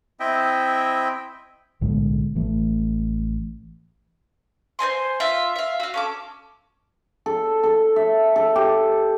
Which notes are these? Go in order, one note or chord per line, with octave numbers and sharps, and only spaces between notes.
C4 E4 D#5 E5 G5
B1 A2 D3 G#3
A1 E3 A3
C5 D#5 G#5 C6
F4 E5
E5 F5
F#4 F5
C#4 A4 D6
A4
A4
E5
A4
G4